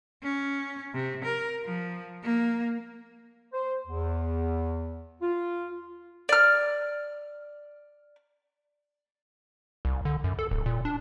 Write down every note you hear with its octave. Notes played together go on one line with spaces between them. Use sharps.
C#4
C3
A#4
F3
A#3
C5
E2
F4
D5 F6
C2
D3
F#2
A4
D1
A#2
D4